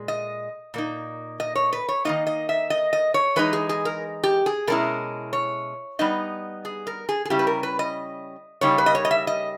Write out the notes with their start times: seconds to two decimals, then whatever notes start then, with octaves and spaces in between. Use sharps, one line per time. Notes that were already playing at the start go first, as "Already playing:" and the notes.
Already playing: A#2 G#3
0.08 D#5
0.74 A#2 A#3 D#4
1.40 D#5
1.55 C#5
1.73 B4
1.89 C#5
2.05 D#3 A#3 D#4 D#5
2.27 D#5
2.49 E5
2.70 D#5
2.93 D#5
3.14 C#5
3.36 E3 G#3 D#4 B4
3.53 G#4
3.69 G#4
3.85 A#4
4.24 G4
4.46 G#4
4.67 B2 G#3 C#4 E4 A#4
5.33 C#5
5.99 G3 B3 D#4 D#5
6.65 G#4
6.87 A#4
7.09 G#4
7.25 G#4
7.30 C#3 G3 C#4 E4 G4
7.39 B4
7.47 A#4
7.63 B4
7.79 D#5
8.61 C#3 G3 A#3 D#4 C#5
8.78 B4
8.86 D#5
8.95 C#5
9.05 D#5
9.11 E5
9.27 D#5